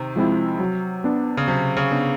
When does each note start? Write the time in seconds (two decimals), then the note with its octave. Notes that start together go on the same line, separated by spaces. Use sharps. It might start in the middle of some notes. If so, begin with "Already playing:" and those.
Already playing: C3 D#3
0.16 F3 G#3 C4 E4
0.60 F#3
1.04 B3 D4
1.37 C#3
1.47 C3 F#3
1.77 C#3
1.91 B3 D4